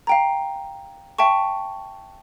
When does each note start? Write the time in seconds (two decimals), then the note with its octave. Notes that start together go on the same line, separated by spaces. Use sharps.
0.07 F5 G5 A#5
1.19 E5 G5 A5 C#6